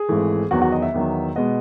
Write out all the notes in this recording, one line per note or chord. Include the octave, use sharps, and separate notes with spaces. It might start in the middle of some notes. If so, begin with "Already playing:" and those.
Already playing: G#4
G#1 G#2 E3 A3
E2 D#3 F#3 B3 F#4
F#4
D#5
E5
E2 D#3 F#3 B3
B2 G#3 B3 D#5